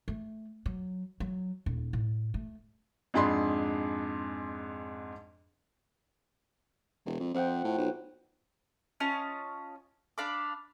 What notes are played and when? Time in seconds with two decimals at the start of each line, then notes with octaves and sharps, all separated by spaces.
0.08 A3
0.66 F#3
1.20 F#3
1.66 D#1
1.93 A2
2.34 A3
3.14 F2 G#2 D4 G#4 B5 C6
7.06 E1
7.20 F2
7.34 F2 F3 F#5 G5
7.65 A2
7.78 B1
9.00 C#4 F4 D#5 A5
10.18 D4 F5 B5 D6